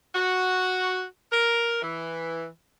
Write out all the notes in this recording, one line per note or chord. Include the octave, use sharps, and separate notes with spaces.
F#4
A#4
E3